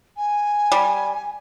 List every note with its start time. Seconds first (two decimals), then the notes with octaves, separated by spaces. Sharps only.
0.17 G#5
0.72 G3